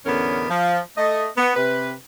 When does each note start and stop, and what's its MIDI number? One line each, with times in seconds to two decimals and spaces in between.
0.06 0.47 40
0.06 0.47 45
0.06 0.47 50
0.06 0.47 59
0.06 0.47 61
0.06 0.47 70
0.50 0.79 53
0.97 1.27 57
0.97 1.27 75
1.38 1.55 59
1.56 1.92 48
1.56 1.92 71